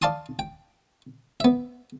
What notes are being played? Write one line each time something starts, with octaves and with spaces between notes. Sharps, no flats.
D5 F5 A5 C6 D#6
G5
B3 E5